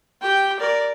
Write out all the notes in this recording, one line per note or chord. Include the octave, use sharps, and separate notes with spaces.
G4 G5
A#4 D5